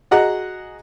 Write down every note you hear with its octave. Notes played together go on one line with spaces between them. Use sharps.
F#4 G#4 D#5 F#5 A#5